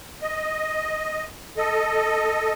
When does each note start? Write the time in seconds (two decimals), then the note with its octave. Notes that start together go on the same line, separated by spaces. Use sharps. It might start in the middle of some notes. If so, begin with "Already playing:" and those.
0.22 D#5
1.57 A4 D#5